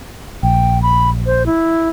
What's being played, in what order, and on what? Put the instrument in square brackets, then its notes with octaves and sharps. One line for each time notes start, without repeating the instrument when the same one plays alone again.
[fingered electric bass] A#1 [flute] G5
[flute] B5
C5
E4